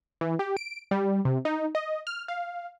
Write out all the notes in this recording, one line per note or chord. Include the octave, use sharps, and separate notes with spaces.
E3
G4
D7
G3
C3
D#4
D#5
F6
F5